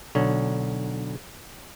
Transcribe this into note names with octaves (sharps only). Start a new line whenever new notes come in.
B1 D3 C#5